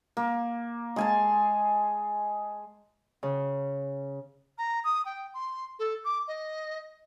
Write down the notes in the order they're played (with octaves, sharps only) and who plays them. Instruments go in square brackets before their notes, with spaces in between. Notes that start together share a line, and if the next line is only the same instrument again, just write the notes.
[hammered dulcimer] A#3
G#3 G#5 A5
[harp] C#3
[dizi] A#5
D#6
G5
C6
A4
D6
D#5